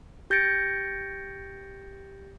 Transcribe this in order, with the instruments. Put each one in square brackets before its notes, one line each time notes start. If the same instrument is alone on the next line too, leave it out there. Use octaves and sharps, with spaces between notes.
[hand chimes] G4 G6 A6 A#6 C#7 D7